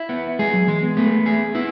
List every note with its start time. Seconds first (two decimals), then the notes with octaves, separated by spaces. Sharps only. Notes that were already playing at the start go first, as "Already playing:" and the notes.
Already playing: E4
0.09 B3
0.39 G#3 G#4
0.54 F#3
0.67 E3 G#3
0.83 B3
0.97 A3 B3
1.26 G#4
1.55 B3 E4